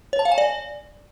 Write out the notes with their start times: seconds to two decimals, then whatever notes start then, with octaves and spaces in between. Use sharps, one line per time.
0.13 C#5
0.19 A5
0.25 F5
0.32 G#5
0.38 D5